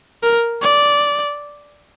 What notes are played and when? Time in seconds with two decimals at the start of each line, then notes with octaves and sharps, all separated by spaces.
0.23 A#4
0.63 D5